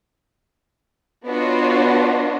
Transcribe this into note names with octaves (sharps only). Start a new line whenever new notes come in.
B3 D4 F4 F#4 C#5 D#5